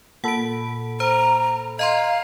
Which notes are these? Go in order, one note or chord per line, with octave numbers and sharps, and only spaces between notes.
A#2 A4 F#5 B5 D7
C5 A#5
D#5 F5 A#5 C6